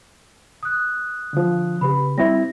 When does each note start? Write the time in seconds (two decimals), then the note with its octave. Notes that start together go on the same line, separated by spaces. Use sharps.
0.63 D#6 F#6
1.33 D3 F3
1.81 C#3 G4 B4 B5
2.18 G3 C4 E4 A#6